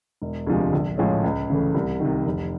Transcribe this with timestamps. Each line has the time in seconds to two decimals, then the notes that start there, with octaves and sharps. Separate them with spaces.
0.22 E1
0.47 D2 C3 F3 G#3
0.73 A#1
0.98 A2 F3 G#3 C#4
1.24 C#2
1.50 C#3 E3 A3
1.74 C2
2.00 C3 D#3
2.26 F1